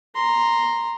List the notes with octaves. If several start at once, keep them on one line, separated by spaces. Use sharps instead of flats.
A#5 C6